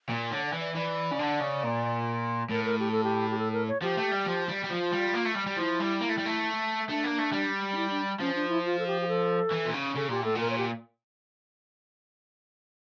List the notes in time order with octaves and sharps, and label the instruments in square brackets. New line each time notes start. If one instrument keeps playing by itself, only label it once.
[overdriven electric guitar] A#2
[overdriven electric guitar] D3 [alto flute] C#5
[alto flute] D5
[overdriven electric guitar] E3
[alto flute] D5
[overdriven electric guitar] E3 [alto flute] D5
[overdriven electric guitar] C#3
D3
C#3
A#2
[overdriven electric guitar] A2 [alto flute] A#4
[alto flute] A#4
G4
A4
G4
G4
A4
A#4
C#5
[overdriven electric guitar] F3 [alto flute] G4
[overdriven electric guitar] A3
G3
F3
G3
G3
[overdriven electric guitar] F3 [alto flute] F4
[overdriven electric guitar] G3
A#3
A3
G3
G3
[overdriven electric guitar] F3 [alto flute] E4
[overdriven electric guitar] G3
A#3
A3
G3
A3
[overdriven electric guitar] A3 [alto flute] D4
[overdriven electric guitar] A#3
A3
G3
[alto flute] D4
E4
D4
[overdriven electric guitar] F3 [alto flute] C#4
[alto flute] D4
E4
F4
A4
G4
G4
A4
[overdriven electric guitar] E3
A#2
C#3
[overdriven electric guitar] C#3 [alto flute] A4
[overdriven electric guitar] A#2 [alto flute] G4
[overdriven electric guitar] A2 [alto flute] A4
[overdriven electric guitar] A#2
[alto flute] A#4
C#5
G4